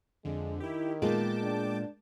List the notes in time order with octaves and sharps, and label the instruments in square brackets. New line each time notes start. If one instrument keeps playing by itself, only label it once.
[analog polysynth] F2 D3 [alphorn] G#3
[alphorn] D#3 [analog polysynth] E4 G4
[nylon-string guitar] A#2 B3 F4 [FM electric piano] G#3 [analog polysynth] G5 A5 D6
[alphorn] D4